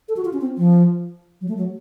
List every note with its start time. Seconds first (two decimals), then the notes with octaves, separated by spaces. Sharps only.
0.08 A4
0.17 F#4
0.25 F4
0.33 C#4
0.41 C4
0.57 F3
1.41 F#3
1.49 A3
1.57 F#3